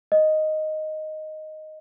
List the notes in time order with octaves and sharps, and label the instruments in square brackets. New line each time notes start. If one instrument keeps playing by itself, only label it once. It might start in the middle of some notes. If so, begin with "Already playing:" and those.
[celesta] D#5